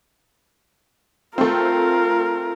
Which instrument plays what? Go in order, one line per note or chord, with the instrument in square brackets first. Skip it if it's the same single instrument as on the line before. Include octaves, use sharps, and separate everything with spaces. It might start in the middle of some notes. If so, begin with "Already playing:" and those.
[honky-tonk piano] A3 C4 [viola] F4 A#4